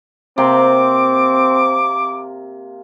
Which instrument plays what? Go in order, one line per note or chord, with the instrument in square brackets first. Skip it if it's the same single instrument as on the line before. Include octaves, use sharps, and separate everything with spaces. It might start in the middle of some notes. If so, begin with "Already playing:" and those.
[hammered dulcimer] C3 A#3 C6 [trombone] C4 [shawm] D6